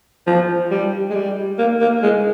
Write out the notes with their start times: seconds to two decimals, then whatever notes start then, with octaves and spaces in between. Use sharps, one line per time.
0.27 F3
0.71 G3
1.10 G#3
1.15 G3
1.59 A#3
1.81 A#3
2.03 G#3